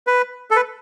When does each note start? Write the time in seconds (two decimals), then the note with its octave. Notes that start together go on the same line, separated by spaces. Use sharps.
0.07 B4
0.51 A4
0.56 B4